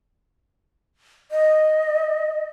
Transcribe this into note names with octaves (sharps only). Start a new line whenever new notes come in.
D#5